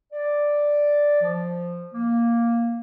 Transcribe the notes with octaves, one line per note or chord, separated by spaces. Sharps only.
D5
F3
A#3